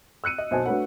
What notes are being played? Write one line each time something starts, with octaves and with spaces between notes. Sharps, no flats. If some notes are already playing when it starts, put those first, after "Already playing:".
E6 F#6 C#7 D#7
D#5
B1 C5 D#5 G#5 A5
A3 D4 F#4 B4 C#5 F#5